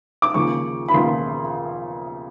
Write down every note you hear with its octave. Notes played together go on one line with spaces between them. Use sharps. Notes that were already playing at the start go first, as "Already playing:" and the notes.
D6
D#2 C#3 F3 C#6
B5
D#2 C#3 F3 C6